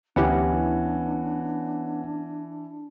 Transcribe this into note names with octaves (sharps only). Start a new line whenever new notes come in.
D2 E3 B3 C#4 D4 E4 G4 F#5